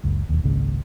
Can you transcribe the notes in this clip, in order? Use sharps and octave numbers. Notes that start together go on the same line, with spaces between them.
F#1 C#2
E1 D#2
G#1 C#2 A#2 C#3